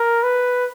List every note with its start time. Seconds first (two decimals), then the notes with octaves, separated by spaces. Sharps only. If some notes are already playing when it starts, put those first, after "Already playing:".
Already playing: A#4
0.23 B4